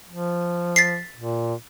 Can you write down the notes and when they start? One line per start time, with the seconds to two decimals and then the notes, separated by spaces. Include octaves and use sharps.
0.09 F3
0.76 A6 B6 C7
1.16 A#2